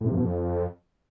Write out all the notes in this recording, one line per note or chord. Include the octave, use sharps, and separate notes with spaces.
A2
C3
F2
B2
F2